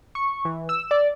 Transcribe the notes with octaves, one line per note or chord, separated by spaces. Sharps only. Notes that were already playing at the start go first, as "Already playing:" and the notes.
C#6
E3
E6
D5